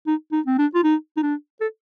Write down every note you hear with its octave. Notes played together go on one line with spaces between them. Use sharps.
D#4
D#4
C4
D4
F4
D#4
D#4
D4
A4